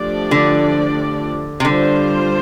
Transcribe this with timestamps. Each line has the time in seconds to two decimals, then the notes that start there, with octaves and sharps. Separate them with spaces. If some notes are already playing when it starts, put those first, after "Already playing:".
Already playing: F3 A3 D4 G4 D5
0.31 D3
1.60 C3
1.64 D3 G3 D4 F4 C5